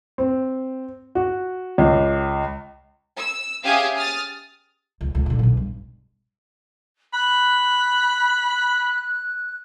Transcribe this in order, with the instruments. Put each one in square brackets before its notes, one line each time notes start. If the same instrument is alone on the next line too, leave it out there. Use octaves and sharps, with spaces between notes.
[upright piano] C4
F#4
C#2
[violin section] E6
C#4 G4 G#4 E5 F5 D#6
D#6 F6 A6
[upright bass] C#2
C#2
A#2 D3
B1 E2
G2
[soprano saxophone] B5 [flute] F#6